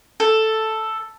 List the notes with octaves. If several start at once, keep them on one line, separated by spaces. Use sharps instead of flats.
A4